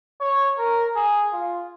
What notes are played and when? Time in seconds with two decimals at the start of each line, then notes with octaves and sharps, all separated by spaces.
0.20 C#5
0.58 A#4
0.96 G#4
1.33 F4